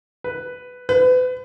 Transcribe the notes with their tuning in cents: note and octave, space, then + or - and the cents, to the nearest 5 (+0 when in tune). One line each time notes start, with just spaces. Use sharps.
B4 +10
B4 +35